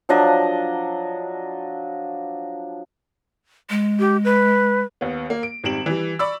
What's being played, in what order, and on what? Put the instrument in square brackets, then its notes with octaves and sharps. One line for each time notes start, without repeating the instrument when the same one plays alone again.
[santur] F3 F#3 D4 D#5
[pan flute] G#3
[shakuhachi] G4
B4
[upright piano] D#2 B3
A#3
D7
G#1 D#3 G3 D7 E7 F#7
E3 G3
D5 B5 C#6 E6